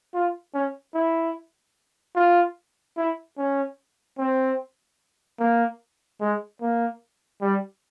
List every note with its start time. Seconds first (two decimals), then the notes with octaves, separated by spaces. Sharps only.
0.14 F4
0.54 C#4
0.94 E4
2.16 F4
2.97 E4
3.38 C#4
4.18 C4
5.39 A#3
6.21 G#3
6.62 A#3
7.42 G3